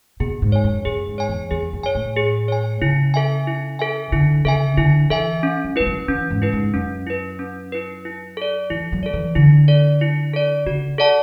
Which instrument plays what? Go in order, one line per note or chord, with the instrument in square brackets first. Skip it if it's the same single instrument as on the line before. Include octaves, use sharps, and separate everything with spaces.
[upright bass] B2 [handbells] G#4
[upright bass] G#2
[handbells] C#5 G#5
[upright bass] F#2
[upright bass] F#2 [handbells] G#4
[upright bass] G#2
[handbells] C#5 G#5
[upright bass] E2
[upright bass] E2 [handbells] G#4
[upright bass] F#2
[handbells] C#5 G#5
[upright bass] A2
[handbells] G#4
C#5 G#5
[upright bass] C#3 [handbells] E4
[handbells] A4 E5 G#5
E4
A4 E5 G#5
[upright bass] D3 [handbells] E4
[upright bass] C#3 [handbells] A4 E5 G#5
[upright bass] D3 [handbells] E4
[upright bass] E3 [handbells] A4 E5 G#5
[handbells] C#4
[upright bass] F#3
[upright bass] G#3 [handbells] E4 B4
[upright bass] F#3
[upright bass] E3 [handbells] C#4
[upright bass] G#2
[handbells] E4 B4
[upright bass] G#2
[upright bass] F#2 [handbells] C#4
[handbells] E4 B4
C#4
E4 B4
E4
A4 D5
[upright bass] E3 [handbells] E4
[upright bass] F#3
[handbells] A4 D5
[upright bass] E3
[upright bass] D3 [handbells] E4
[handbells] A4 D5
E4
A4 D5
[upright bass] C#3 [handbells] F#4
[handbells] A4 D5 F#5 A5